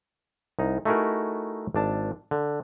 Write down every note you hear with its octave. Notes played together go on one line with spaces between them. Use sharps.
C2 D#4
A3 D#4 E4 F#4 G#4 A#4
G#1 D4 A5
D3